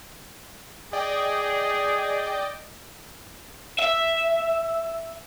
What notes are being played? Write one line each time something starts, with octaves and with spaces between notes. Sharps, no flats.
G#4 D5 D#5 G5
E5